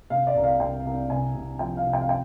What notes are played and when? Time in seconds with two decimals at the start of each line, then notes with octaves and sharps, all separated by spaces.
0.10 C3 F5
0.27 D5
0.35 C2
0.43 F5
0.60 C2 G5
0.85 C2
1.10 C3 G#5
1.35 C3
1.59 F3 G5
1.77 F5
1.84 C3
1.93 G5
2.01 F5
2.09 G5